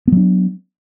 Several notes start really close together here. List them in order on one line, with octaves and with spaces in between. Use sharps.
B3 F#3 D4